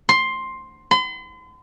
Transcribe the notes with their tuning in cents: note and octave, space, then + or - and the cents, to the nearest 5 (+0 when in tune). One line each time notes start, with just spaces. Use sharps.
C6 +10
C6 -45